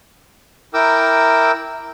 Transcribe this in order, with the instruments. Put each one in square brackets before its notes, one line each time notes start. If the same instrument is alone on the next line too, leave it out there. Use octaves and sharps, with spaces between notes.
[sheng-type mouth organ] E4 A#4 G5 A#5 D6 E6